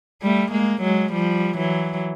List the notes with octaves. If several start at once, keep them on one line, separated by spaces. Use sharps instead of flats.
G3 A3
G#3 A#3
F#3 G#3
F3 G3
E3 F#3